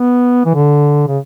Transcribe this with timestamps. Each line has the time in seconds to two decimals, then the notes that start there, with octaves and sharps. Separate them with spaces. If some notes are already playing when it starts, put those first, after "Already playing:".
Already playing: B3
0.46 E3
0.55 D3
1.08 C#3